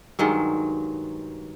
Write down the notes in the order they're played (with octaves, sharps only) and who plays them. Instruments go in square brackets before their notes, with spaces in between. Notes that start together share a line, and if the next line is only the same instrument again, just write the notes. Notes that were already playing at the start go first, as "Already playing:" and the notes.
[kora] G2 D#3 F#3 G#3